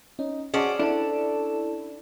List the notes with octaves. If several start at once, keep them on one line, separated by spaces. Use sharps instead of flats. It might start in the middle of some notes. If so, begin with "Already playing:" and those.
C#4 D#4
C#4 F#4 G#4 C5 D5 D#5 A5
D4 E4 A4